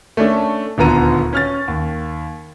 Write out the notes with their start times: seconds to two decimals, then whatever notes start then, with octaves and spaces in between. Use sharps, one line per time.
0.17 A3 C#4 D4 A4
0.78 D#1 D2 D3 B3 A#5 D#7
1.33 C#4 F6 A6
1.68 D#2